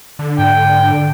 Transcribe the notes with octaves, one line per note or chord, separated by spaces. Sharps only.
D3
G#2 G5